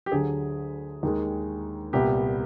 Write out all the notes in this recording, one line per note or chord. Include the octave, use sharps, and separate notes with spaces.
G4
D2 D3 F#3 G#4
D#2 D#3 G#3
C2 A#2 G3 B3 G4